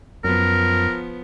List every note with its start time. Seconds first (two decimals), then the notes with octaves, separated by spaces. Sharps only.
0.24 F#2 F3 B3 A#4